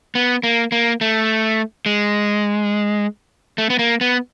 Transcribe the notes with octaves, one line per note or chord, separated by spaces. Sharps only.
B3
A#3
A#3
A3
G#3
A3
B3
A#3
B3